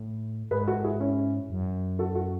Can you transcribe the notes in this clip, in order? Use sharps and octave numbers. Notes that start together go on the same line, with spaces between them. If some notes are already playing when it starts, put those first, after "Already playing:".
Already playing: A2
G#2 G#4 B4
F#4 A4
E4 G#4
C#4 E4
F#2
F#4 A4
F#4 A4